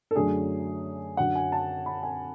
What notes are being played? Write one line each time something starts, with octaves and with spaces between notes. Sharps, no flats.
A4
F#2 D3 F#3 A3 D4 G#4
F#2 D3 F#3 F#5
G#5
A5
B5
G#5